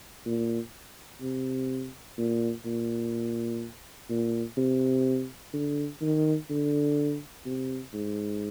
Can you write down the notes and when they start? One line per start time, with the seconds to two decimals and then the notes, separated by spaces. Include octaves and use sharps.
0.26 A#2
1.21 C3
2.18 A#2
2.65 A#2
4.10 A#2
4.57 C3
5.53 D3
6.01 D#3
6.50 D3
7.46 C3
7.94 G#2